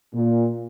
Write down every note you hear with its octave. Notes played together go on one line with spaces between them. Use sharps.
A#2